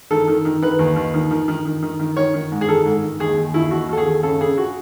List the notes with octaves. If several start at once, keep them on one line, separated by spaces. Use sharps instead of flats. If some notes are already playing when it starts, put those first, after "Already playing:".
D#3 A4
D#3
D#3
D#3 B4
D#2
D#2
D#3
D#3
D#3
D#3
D#3
D#3
D#3 C#5
D#3
G#2
G#4
D#3 A4
G#2
D#3
D#2 G#4
D#2
D#2 E4
D#2 F#4
D#2 A4
G#4
D#2
C#3 A4
C#3 G#4
F#4